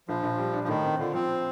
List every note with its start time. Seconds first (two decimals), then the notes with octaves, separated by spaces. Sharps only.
0.08 A#1 F3
0.23 A#1
0.38 G3
0.53 D4
0.64 F3
0.68 A2 D#3
0.84 C4
0.99 D3 F4
1.14 F3 C4